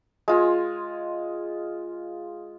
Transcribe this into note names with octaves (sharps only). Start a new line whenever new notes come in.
G#3 F4 G#5